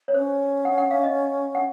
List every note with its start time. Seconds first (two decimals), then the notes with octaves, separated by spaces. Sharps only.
0.08 C#5
0.14 C#4 C5
0.65 F#5
0.78 F#5
0.91 F5
1.03 D#5
1.55 F#5